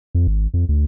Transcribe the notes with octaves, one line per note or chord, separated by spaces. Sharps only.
F2
G#1
F2
D2